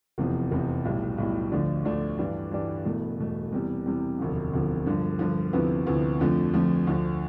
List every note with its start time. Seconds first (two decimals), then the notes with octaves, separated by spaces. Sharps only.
0.18 F1 E2 C3 F3
0.51 F1 E2 C3 F3
0.85 B1 A2 G3
1.18 B1 A2 G3
1.52 D2 D3 F3 A3 D4
1.85 D2 D3 F3 A3 D4
2.18 G2 E3 G3 D4
2.52 G2 E3 G3 D4
2.85 E1 E2 B2 A3
3.19 E1 E2 B2 A3
3.52 E2 C3 G3
3.86 E2 C3 G3
4.19 E1 D2 C3 F3
4.53 E1 D2 C3 F3
4.86 G2 D3 F3
5.19 G2 D3 F3
5.53 D2 C3 F3 B3 E4
5.86 D2 C3 F3 B3 E4
6.20 F2 D3 F3 A3
6.54 F2 D3 F3 A3
6.87 D2 D3 F3